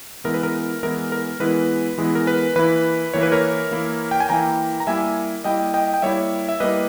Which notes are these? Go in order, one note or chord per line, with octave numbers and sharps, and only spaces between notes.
E3 G#3 B3 E4 A#4
B4
A#4
E3 G#3 B3 E4 A#4
A#4
E3 G#3 B3 E4 B4
E3 G#3 B3 E4
A#4
B4
E3 A#3 E4 B4
E3 A#3 E4 C#5
B4
A#4 C#5
E3 A#3 E4
G5
G#5
E3 A#3 E4 G5 A#5
A#5
G3 A#3 E4 E5 G#5
G3 A#3 E4 D#5 G5
D#5 G5
G5
G3 A#3 E4 C#5 E5
E5
G3 A#3 E4 B4 D#5